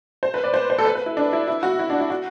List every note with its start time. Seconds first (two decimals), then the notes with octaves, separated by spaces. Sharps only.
0.23 C5
0.34 B4
0.44 D5
0.54 C5
0.70 C5
0.78 A4
0.85 B4
0.95 B4
1.06 E4
1.17 D4
1.33 E4
1.48 E4
1.63 F#4
1.79 E4
1.90 D4
2.00 E4
2.10 F#4